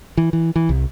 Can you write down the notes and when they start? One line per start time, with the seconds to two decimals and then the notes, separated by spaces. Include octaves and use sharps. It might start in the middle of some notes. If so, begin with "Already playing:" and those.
0.17 E3
0.33 E3
0.56 E3
0.69 C2